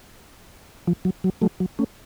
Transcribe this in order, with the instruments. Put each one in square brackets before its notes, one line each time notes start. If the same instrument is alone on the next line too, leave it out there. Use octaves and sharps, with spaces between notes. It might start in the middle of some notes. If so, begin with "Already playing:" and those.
[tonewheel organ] F3
F#3
F#3
F#3 A3
F#3
A3 C#4